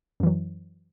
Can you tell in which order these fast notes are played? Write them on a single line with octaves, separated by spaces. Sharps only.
F#2 E3 F#3